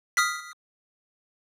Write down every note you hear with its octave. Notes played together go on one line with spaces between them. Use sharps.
D#6 F6 B6